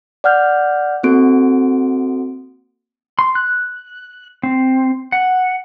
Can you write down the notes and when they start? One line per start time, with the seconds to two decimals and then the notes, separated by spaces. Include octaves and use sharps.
0.24 D5 F#5 F6 G6
1.03 A#3 C4 F#4 A4 D7
3.19 C6
3.35 F#6
4.43 C4
5.12 F#5